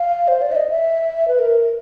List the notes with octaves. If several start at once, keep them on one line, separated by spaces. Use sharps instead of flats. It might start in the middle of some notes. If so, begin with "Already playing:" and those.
Already playing: F5
C5
D5
E5
D#5
E5
B4
A#4